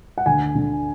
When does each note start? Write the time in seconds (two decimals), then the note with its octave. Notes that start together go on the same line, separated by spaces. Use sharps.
0.18 F#5
0.26 D2 G#5
0.55 D3